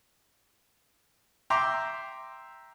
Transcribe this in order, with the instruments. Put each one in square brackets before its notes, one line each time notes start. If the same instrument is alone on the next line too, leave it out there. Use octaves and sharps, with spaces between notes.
[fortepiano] E5 G5 A#5 C6 D6 E6